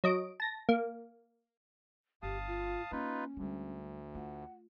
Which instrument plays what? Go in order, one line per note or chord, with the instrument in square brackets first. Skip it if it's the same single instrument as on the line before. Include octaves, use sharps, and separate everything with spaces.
[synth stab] F#3 D#5 D7
A5 A#6
A#3
[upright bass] G1 [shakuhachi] G4 [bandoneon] F5 A5 D#6
[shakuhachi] F4
[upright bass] A#3 [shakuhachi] C#4 [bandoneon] D#4 F4 B4
[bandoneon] D2 [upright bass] G3 G#3
[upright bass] A3 F4 [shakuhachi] F#5